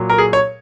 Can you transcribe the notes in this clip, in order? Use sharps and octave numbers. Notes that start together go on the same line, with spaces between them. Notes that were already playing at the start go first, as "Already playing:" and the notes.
Already playing: A#2 F#3
A#4
G#4
C#5